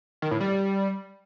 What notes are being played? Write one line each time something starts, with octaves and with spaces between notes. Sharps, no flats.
D#3
A2
G3